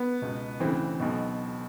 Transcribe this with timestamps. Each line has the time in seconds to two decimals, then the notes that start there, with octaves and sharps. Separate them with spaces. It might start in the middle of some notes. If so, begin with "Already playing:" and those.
Already playing: B3
0.22 C#2 B2
0.60 D2 C#3 E3 C4
1.00 B1 B2